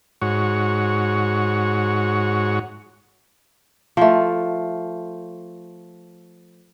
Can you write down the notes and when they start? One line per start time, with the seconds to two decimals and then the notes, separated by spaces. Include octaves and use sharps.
0.22 G#2 F#4 C#5
3.97 F3 A3